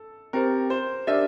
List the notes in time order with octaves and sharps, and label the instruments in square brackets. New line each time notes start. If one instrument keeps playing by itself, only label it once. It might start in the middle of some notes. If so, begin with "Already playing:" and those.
Already playing: [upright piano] A4
[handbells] C4 G4 C5 [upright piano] A#4
[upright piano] C5
[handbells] D4 G4 A#4 D5 [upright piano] E5